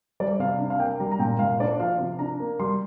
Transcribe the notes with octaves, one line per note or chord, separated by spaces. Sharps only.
G3 D5
C3 F5
D4
F5
A#3 G5
G3 A#5
A#5
A#2 G5
A#2 F5
D4 D5
F3 F5
C3
D4 A#5
A#3
G3 C6